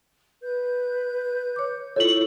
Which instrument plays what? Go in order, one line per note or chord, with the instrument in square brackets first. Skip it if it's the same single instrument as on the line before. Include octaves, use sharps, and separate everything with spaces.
[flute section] B4 G6
[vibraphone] C#5 D6
[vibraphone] E4 F4 A4 [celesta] C#5 F#7 [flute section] C#6 E6